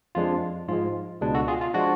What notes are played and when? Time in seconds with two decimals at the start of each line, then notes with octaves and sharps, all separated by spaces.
0.15 F2 F3 G#3 D4 F4
0.68 G#2 F3 G#3 F4
1.21 C#2 B2 G#3 D4
1.34 F#4 A4
1.48 F4 G#4
1.61 F4
1.74 F3 G#3 D4 F#4